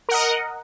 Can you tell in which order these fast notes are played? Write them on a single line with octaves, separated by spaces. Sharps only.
A#4 F#5 D#5